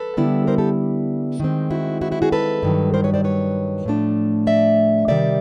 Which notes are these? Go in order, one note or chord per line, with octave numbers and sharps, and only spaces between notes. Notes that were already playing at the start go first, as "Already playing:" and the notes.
Already playing: A4 B4
D3 G3 B3 E4
A#4 C5
G4 A4
D#3 G#3 C4
E4 F#4
E4 F#4
E4 F#4
F#4 G#4
A4 B4
G2 D#3 F#3
A#4 C5
B4 C#5
C5 D5
B4 C#5
A2 F3 A3 D4
D5 E5
C3 D#3 G3 D5 E5